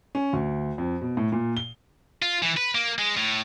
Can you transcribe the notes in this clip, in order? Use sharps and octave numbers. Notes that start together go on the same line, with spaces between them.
C#4
D2
F2
B2
A2
A#2
G7
F4
E3
B4
A#3
G#3
A2